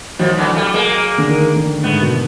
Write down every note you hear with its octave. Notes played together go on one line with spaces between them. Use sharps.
D#3 F3 F#3
D3 E3
G3 A3
G#3 A#3
D3
D#3
D3
G#2 A3 B3
B2